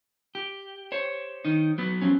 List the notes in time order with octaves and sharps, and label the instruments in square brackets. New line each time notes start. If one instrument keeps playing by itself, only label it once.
[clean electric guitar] G4
[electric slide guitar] C5 C#5
[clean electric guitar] D#3 D#4
F#3 B3
[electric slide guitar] F3 C4 C#4